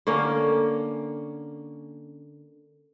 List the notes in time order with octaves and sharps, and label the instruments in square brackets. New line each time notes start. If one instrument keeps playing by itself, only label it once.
[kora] D3 A#3 C#4